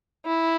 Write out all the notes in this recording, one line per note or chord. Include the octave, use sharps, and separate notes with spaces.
E4